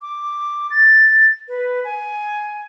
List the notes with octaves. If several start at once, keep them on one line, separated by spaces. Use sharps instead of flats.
D6
A6
B4
G#5